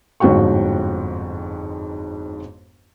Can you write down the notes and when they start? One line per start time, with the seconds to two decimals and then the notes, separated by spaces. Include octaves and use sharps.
0.20 G1 F2 G#2 F#4 G5 C#6